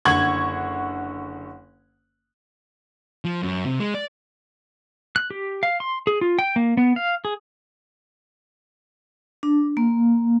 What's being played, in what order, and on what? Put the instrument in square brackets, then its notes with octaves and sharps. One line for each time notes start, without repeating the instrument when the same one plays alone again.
[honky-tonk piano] F#1 D3 F#5 C#6 G#6 F#7
[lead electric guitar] F3
F#2
C3
G#3
D5
[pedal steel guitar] F#6
G4
F5
C6
G#4
F4
G5
A#3
B3
F5
G#4
[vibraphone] D4
A#3